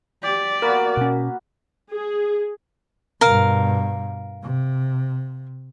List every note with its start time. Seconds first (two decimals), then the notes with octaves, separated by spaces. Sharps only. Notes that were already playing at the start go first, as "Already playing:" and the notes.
0.23 G4 D5
0.62 A#3 B3 F#4 A#4
0.97 B2 C#4
1.92 G#4
3.21 G2 B2 A#4 F5
4.43 C3